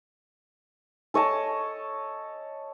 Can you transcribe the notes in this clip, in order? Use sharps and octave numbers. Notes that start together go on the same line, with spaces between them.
A4 C#5 D#5 A5